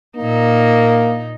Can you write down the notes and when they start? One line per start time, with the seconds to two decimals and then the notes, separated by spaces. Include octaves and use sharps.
0.17 A#2 A#3 D#4